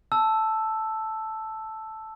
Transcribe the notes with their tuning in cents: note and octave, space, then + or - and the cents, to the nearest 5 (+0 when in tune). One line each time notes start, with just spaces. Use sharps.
A5 +0 E6 +0